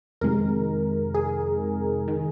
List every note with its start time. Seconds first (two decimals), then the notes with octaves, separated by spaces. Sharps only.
0.21 F2 C3 D#3 G#3 A#4
1.14 G#4
2.08 D#3